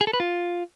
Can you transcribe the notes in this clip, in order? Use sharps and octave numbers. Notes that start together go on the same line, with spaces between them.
G#4
A4
B4
F4